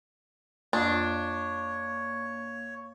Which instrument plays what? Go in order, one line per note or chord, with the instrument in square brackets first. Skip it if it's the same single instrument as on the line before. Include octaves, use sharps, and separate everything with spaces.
[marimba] F2 F4 D#6 [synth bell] A#3 F5 [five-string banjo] D4 [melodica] C#5